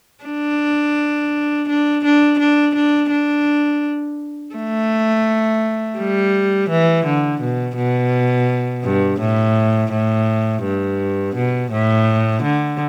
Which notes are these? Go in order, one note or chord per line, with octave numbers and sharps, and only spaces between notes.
D4
D4
D4
D4
D4
D4
A3
G3
E3
D3
B2
B2
G2
A2
A2
G2
B2
A2
D3